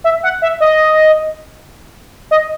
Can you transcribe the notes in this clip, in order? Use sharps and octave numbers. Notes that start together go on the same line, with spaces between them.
E5
F#5
E5
D#5
D#5